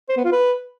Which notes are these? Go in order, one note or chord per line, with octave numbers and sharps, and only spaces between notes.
C5
B3
F4
B4